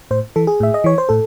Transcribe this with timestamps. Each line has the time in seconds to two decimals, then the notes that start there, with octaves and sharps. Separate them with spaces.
0.11 A2 C5
0.36 E3 A4
0.47 G#4
0.60 A2 E5
0.74 D#5
0.84 E3 C#5
0.98 C5
1.09 A2 A4